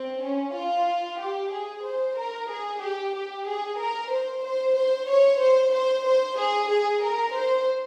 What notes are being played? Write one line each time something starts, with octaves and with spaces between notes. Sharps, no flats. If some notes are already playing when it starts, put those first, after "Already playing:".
Already playing: C4
C#4
F4
G4
G#4
C5
A#4
G#4
G4
G4
G#4
A#4
C5
C5
C5
C#5
C5
C5
C5
G#4
G#4
A#4
C5